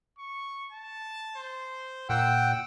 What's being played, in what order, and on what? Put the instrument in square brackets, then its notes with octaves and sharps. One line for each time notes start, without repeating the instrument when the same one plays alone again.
[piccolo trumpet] C#6
A5
C5
[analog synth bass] A#2 [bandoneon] F#5 G5 [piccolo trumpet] E6